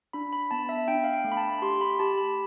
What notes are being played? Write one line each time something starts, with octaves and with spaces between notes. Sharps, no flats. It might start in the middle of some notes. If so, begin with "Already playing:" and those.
D4 B5
B5
B3 A5
E5
D4 G5
F5
G5
A3
B5
A5
G4 C6
B5
G4 A5
B5